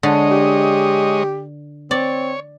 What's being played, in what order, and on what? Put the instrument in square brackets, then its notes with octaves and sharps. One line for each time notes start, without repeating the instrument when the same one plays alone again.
[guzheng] D3 [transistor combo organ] G#3 C#5 D#5
[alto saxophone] G4
[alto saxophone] C4 [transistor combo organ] C#5 [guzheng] D5